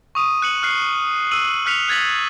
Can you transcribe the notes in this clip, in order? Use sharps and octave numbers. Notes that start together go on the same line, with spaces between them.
C#6 D#6 D#7
F#6 C#7 F#7
F6 F#6 C7
E6 D#7 F#7
F6 F#6 B6 C#7 F7
F#6 G#6 A6 B6 F#7